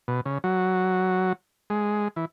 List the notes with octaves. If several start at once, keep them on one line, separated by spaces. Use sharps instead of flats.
B2
C#3
F#3
G#3
E3